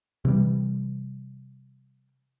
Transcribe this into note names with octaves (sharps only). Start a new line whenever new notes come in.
C3 E3 G3